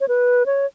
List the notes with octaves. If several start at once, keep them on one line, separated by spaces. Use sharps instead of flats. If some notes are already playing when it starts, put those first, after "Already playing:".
C#5
B4
C#5